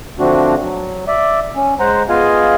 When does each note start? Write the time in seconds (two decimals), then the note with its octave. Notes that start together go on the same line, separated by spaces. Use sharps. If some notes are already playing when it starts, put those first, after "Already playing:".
0.20 D3 F3 A3 C4 D4 F#4
0.62 F#3
1.08 D5 E5
1.56 C#4
1.80 G#3 C5 F#5 A#5
2.09 B3 F4 G#4 D#5 F5 G#5